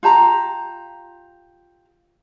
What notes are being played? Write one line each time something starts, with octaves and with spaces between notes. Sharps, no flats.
F4 G4 A5 A#5